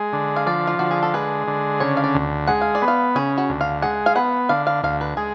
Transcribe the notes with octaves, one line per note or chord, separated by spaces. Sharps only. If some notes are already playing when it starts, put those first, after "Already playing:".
Already playing: G#3
D3
F5
F3 D5
F4
D3 F#4
G#4
A4
G#3 B4
D3
C#3 C#5
F5
D5
D2
G#3 F#5
F5
D5
B3
F5
C#3 G#4
F#4
D2
F5
G#3 F#5
F5
B3 F#5
D3 F5
F5
D2 F5
B4
G#3 G#4